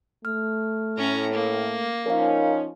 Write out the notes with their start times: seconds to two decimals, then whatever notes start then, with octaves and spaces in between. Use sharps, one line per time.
0.25 A3 F6
0.97 A2 C#4 A#5
1.33 A#3
2.06 F3 C#4 D#4 A#4 F5